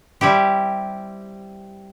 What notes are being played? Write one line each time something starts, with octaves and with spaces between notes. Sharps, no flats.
G3 C4 E4 G4